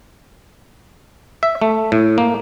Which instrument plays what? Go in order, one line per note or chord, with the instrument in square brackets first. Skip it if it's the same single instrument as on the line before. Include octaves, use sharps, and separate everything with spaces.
[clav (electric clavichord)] E5
A3
A2
A#3